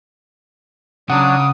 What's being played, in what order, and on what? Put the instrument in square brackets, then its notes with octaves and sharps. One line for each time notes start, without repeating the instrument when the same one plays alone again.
[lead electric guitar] C#3 [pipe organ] F#3 D4 [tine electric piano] F#5 [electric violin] D#6